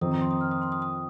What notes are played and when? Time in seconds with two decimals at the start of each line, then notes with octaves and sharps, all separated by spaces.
0.01 F2 D#3 C4 D#6
0.11 A#5
0.21 C6
0.31 D#6
0.41 F6
0.51 D#6
0.61 C6
0.72 D#6
0.82 D#6